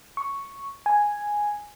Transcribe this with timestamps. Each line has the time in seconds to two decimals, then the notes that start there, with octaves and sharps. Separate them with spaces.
0.17 C#6
0.86 G#5